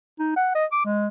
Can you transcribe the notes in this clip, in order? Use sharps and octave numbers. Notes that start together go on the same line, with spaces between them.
D#4
F#5
D#5
D6
G#3